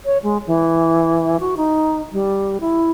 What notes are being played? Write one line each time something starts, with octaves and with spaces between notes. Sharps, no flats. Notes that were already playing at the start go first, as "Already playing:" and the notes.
C#5
G#3
E3
F#4
D#4
G3
E4